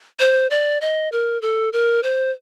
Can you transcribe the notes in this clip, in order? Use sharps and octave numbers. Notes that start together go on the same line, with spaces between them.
C5
D5
D#5
A#4
A4
A#4
C5